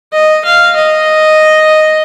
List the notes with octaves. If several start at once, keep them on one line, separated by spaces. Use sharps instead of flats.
D#5
F5
D#5